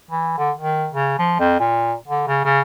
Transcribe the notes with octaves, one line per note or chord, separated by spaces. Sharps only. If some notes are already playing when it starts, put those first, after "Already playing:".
E3
D3
D#3
C#3
F3
F2
A#2
D3
C#3
C#3